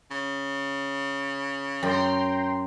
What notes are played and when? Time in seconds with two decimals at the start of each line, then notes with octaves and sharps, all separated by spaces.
0.11 C#3
1.83 F#2 G5 A#5 C6